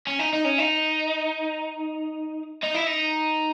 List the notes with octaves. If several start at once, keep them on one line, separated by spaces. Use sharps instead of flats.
C#4
D#4
D#4
C#4
D#4
D#4
E4
D#4